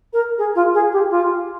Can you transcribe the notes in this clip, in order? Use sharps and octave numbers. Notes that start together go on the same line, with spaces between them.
A#4
G#4
F4
G#4
G4
F4